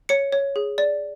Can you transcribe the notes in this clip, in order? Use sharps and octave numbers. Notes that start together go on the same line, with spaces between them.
C#5 C#7
C#5
G#4
D5